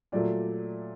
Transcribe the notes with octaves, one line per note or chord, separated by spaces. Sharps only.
A#2 F#3 A3 D5